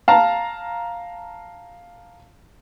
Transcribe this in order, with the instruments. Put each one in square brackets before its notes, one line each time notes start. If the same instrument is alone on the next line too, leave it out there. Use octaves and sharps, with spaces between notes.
[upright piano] F5 A5 A#5